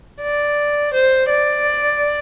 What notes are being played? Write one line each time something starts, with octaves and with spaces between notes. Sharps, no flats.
D5
C5
D5